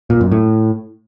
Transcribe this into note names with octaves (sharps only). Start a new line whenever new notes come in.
A#2
F#2
A2